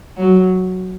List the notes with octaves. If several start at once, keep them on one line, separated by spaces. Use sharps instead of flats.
F#3